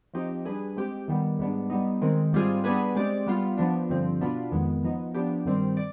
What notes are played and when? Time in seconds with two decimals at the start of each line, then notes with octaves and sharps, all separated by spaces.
0.14 F3 C4 D#4 G4
0.45 G3 D4 G#4 B4
0.76 G#3 C4 G4
1.08 D#3 G3 B3
1.39 G#2 G3 B3 D4
1.70 G3 B3 D#4
2.02 D#3 G#3 C4
2.33 G#2 G3 C4 F4 G#4
2.64 G3 B3 D4 G#4 B4
2.95 G#3 C4 G4 D5
3.26 G3 B3 F4
3.58 F3 B3 D4
3.89 G2 D3 F3 C4
4.20 B2 B3 D4 F4 B4
4.52 F2 D#3 G#3 B3
4.83 F3 B3 D#4
5.14 F3 B3 D4 G4
5.45 G2 D#3 G3 C4
5.77 D5